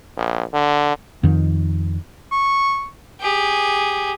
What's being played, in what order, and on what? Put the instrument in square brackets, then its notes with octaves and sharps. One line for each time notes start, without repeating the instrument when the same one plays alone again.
[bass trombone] A#1
D3
[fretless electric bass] F2 D#3
[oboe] C#6
[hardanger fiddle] G4 G#4